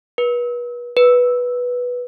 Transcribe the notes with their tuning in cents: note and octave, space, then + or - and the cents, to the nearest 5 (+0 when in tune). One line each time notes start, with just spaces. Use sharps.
B4 -35
B4 -5